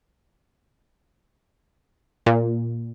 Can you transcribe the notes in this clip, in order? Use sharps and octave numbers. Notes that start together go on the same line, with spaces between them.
A#2